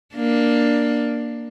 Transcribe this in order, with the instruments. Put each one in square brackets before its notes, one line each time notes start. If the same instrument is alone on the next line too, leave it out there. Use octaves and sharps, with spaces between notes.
[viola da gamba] A#3 D4